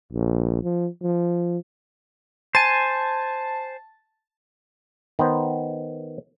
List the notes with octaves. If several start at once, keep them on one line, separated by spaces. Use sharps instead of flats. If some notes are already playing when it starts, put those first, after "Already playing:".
A#1
F3
F3
C5 G#5 A5
D#3 B3 C5